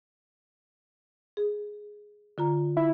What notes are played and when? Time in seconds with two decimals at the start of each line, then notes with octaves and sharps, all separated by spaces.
1.37 G#4
2.38 D3 F4 A#5
2.77 E4